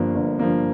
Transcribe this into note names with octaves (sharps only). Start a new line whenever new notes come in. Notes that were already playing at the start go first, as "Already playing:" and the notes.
Already playing: G1 G2 F3 A#3
G1
G2 F3 A#3